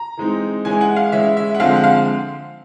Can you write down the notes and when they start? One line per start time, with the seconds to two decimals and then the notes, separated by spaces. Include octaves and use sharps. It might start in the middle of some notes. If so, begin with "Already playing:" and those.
Already playing: A#5
0.17 E3 G#3 C4 D#4
0.65 E3 G#3 C#4 E4 G#5
0.81 F#5
0.96 F5
1.12 E3 G#3 C#4 E4 E5
1.37 E5
1.55 F#5
1.60 D3 F3 G#3 C4 F5
1.76 F#5
1.84 F5